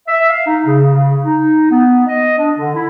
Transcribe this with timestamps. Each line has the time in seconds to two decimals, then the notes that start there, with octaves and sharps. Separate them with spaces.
0.08 E5
0.29 F5
0.47 D#4
0.66 C#3
0.94 C#3
1.24 D#4
1.71 B3
2.07 D#5
2.38 D4
2.58 D3
2.75 E4